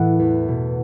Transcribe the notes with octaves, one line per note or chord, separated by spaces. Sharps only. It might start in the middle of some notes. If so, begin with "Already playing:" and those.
Already playing: A2 E3 E5 F#5 A5
E2
B2